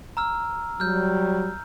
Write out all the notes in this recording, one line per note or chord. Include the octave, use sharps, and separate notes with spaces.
A#5 E6 F6
F#3 G3 F6 G6